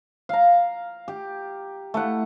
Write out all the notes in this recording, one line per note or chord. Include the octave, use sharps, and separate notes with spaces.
F5 A#5
G4
A3 E4 F#5